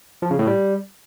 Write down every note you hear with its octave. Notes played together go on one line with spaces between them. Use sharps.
F3
C#3
A2
G3